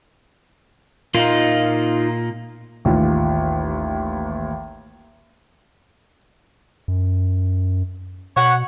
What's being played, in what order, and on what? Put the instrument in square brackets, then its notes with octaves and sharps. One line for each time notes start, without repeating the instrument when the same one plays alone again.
[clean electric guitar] A#2 A#3 [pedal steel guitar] D#4 F4
[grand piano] A1 D#2 F4
[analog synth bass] F#2
[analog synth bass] B2 [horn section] C#5 F#5